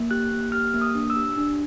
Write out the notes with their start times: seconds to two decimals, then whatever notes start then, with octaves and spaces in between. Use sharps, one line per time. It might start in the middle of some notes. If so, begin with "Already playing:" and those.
Already playing: A#3
0.11 G4 F#6
0.32 A#3
0.52 G4 F6
0.74 A#3
0.82 D#6
0.95 D4
1.10 E6
1.16 G4
1.38 D4